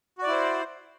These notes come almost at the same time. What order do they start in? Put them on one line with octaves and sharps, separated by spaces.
F#4 D5 E4 C5